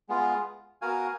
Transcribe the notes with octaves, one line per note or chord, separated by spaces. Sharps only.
G#3 B3 F4
B3 F#4 A#4 F5 G#5